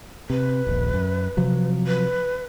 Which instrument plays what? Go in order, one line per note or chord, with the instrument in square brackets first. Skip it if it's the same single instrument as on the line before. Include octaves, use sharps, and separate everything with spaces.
[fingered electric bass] C3 [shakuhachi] B4
[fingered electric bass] D#1 A#1
F#2
C3 F3 F#3
[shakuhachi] B4